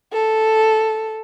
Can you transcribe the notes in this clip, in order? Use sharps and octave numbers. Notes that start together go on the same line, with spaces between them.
A4